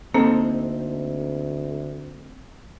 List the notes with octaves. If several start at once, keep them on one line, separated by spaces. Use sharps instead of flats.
D2 A#3 C4 D#4 A4